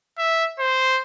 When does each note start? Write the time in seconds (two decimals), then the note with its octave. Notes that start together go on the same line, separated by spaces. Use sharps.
0.18 E5
0.59 C5